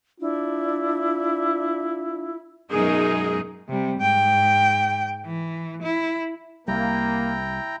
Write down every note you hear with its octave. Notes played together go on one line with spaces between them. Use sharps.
D4 E4 F4
F#2 B2 G#3 D#4 G#4 A#4
C3 G3
G#2 G5
E3
E4
C2 G3 A#3 E4 G5 A#5